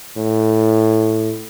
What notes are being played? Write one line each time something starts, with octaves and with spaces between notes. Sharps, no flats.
A2